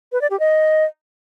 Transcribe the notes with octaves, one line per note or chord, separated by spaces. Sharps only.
B4
D5
G4
D#5